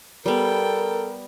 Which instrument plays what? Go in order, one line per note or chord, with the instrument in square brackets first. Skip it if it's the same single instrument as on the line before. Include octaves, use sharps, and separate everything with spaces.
[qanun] G3 B3 [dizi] A4 [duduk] A#4 [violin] G5